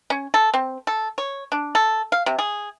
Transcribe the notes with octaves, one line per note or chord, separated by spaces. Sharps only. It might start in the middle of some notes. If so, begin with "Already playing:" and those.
C#4
A4
C4
A4
C#5
D4
A4
F5
C3
G#4